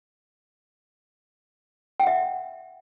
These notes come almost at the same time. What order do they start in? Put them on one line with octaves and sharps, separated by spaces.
G5 F#5 E5